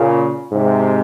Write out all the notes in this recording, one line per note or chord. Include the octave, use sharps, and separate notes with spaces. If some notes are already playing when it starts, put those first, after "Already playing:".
Already playing: A#2 C#3
G#2 C3